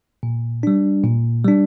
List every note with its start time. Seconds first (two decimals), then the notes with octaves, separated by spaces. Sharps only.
0.23 A#2
0.63 G3 D4
1.04 A#2
1.45 G3 D4